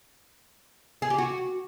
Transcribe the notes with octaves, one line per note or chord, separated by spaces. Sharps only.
G#4
G4
F#4